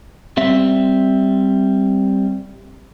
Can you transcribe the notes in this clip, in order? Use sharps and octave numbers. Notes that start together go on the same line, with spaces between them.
G3 C4 E5